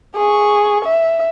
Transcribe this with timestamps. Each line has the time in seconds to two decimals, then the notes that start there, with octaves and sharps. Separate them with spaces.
0.16 G#4 C#6
0.85 E5